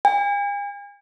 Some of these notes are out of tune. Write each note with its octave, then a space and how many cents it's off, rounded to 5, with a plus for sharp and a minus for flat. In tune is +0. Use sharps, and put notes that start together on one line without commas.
G#5 -45